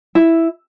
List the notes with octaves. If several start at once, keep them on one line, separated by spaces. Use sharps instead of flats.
E4